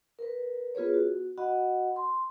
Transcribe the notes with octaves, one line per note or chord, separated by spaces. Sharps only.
A#4 B4
B3 F4 G#4 B4 C#5
F#4
F#4 D#5 F#5 B5
C6